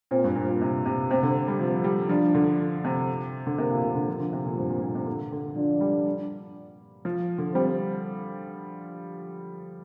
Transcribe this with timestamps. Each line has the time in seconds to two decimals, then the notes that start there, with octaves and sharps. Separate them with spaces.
0.11 A#2 C4
0.24 G2
0.36 A#2
0.49 A#2
0.62 C3
0.86 C3
1.10 C3 C4
1.23 D3
1.48 G3
1.60 F3 C4
1.84 G3
2.09 F3 D4
2.35 D3
2.84 C3
3.47 D3
3.58 C3 A#3
3.70 A#2
3.82 C3
3.95 D3
4.08 F3
4.20 D3
4.33 C3
4.45 A#2
4.57 G2 C4
4.70 A#2
4.82 A#2
4.95 C3
5.06 D3
5.32 D3
5.56 F3 D4
5.81 G3
7.05 F3
7.38 D3
7.54 G3 C4